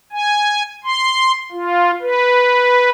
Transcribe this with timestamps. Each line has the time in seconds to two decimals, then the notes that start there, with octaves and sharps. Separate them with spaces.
0.12 G#5
0.84 C6
1.52 F4
2.02 B4